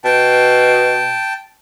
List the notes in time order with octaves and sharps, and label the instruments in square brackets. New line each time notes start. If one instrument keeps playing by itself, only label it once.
[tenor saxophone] B2 [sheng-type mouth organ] G5 A5